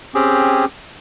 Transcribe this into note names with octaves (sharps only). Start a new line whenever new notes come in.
C4 C#4 G4 G#4